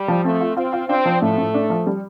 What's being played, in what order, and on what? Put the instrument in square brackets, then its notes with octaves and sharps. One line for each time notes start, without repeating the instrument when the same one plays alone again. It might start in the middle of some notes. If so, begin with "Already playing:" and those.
Already playing: [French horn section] G3
[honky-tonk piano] F3
[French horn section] A3 [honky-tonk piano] C4
[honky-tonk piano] F4
[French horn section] C4 [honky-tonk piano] F4
[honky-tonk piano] F4
[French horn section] C4 [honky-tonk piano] D4
[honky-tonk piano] F3
[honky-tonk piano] A2 [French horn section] A3
[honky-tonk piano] A2
D4
F3
G3